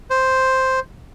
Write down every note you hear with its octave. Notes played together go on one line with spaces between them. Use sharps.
C5